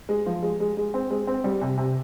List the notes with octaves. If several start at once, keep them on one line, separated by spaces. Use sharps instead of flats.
G#3
F3
G#3
G#3
G#3
C4
G#3
C4
G3
C3
C3